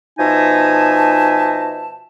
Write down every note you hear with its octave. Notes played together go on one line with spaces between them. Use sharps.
B2 F3 D#4 E5 G#5 A5